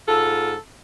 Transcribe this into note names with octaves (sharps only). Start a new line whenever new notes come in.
G#2 F4 A4